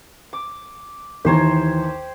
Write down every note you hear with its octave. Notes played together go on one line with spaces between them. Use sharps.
D6
D#2 E3 G4 C5 C#5 A#5